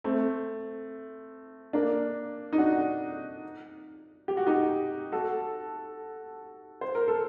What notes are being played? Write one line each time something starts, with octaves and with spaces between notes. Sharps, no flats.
A3 C4
A#3 D4
D#4
D4 F#4
G4
F#4
D#4 G4
F#4 A4
C5
A#4
A4